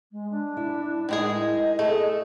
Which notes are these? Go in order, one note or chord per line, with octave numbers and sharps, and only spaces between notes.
G#3
D4
E4
A2 D#3 G#3 G#4 D#5
A3 G#4 A4